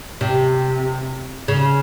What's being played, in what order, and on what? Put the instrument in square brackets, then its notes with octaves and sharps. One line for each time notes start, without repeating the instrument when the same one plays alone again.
[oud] C3
C#3